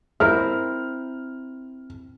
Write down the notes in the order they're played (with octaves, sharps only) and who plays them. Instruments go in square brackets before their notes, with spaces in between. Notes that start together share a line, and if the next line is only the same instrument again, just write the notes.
[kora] C4 E4 A#4 [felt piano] F6